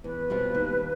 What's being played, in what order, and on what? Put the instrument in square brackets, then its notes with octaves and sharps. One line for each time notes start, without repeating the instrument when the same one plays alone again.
[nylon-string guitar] E2 [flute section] B4
[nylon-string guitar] B2 G3 C4 F4
D#2